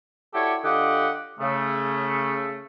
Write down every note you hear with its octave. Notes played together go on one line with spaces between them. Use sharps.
E4 F#4 G4 A4 C#5 D5
D3 F4 G4 D#5 F#5
C#3 A3